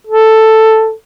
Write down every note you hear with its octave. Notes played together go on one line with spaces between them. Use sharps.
A4